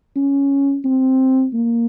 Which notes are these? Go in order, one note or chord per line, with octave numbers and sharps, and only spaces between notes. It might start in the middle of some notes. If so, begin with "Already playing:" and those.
C#4
C4
A#3